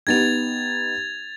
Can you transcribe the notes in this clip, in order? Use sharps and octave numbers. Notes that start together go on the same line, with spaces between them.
B3 D#4 G4 G#6 A6 F7